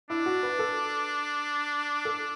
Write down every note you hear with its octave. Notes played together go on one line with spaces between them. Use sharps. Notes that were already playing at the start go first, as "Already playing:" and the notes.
D4 E4
F#4
B4
A4
A4